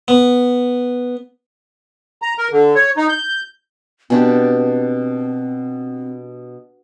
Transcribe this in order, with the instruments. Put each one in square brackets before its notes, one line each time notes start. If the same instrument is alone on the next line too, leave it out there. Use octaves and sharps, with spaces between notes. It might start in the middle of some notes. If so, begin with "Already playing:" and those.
[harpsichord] B3
[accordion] A#5
A#4
D3
C#5
D#4
G6
[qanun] B2 D4 G4 [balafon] B3 [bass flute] C4